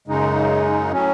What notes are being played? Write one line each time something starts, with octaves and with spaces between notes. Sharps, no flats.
F#2 C#3 G#3 D#4
A2 F#3 C#4